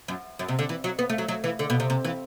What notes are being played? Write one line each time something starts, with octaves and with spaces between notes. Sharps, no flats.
F#2
F#2
C3
D3
E3
F#3
B3
A3
F#3
F#3
E3
D3
B2
C3
C3
E3